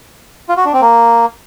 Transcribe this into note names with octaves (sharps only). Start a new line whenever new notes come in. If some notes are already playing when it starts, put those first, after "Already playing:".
F4
F#4
D4
C4
A#3